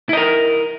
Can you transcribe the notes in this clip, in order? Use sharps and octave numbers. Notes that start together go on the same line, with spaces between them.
E4 A#4 D#5